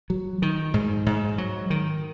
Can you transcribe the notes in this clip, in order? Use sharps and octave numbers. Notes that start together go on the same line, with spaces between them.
F#3
D#3
G#2
G#2
F#3
D#3